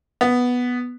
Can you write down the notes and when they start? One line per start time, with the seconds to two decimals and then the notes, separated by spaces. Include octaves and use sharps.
0.21 B3